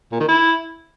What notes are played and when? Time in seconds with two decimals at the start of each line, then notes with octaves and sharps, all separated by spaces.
0.12 A#2
0.20 D#3
0.28 E4